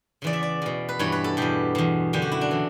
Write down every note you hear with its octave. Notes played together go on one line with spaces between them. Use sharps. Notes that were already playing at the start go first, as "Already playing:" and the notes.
E2 C#3 E3 D5
E5
D5
E2 B2
B4
G2 E3 C#5
B4
A4
E2 B2 G4
E2 B2
F#2 D3 G4
F#4
E4
D4
C#3 E3